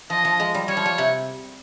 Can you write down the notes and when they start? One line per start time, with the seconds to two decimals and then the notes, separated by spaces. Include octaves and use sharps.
0.10 F3 D#5
0.25 F3
0.40 G#3
0.55 G3
0.68 G3 C#5
0.77 F3
0.86 G3
0.98 C3